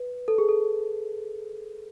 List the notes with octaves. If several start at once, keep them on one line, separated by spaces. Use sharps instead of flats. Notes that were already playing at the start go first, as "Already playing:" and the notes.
Already playing: B4
A4
G#4
A4